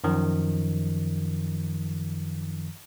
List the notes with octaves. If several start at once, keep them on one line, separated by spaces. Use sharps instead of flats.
F#2 D#3 F3